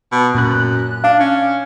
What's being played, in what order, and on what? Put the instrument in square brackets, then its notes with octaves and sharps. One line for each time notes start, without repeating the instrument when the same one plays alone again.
[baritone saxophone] B2
[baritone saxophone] F#2 [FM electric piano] A#2 F#6
[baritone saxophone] D4 [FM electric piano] F5
[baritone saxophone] C#4